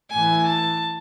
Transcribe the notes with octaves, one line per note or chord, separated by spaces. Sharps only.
A2 E3 G#5
A5